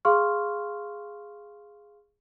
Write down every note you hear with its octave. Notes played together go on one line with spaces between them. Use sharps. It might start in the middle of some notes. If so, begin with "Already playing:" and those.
G#4 F5 C6 C#6 F6